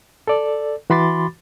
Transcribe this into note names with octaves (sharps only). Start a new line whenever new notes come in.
A4 D5
E3 F#4 B5 C6 D6 A6